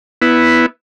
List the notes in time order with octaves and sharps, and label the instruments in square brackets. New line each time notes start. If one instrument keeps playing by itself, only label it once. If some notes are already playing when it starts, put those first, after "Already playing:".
[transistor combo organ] B3 E4